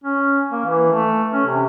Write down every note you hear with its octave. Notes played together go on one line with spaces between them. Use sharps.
C#4
A#3
E3
A3
C#4
C3